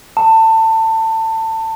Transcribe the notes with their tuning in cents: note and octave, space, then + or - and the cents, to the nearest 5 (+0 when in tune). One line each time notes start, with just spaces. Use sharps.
A5 +25